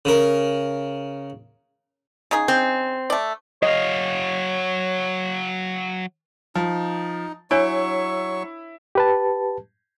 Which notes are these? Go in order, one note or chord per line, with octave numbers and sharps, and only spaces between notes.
C#3 A#4
C#3 D#4 G#4
C4
A3 D5
F#3 C#5 D#5 F5
F3 D#4
F#3 D4 E4 C#5 G#5 C#6
G4 B4 A5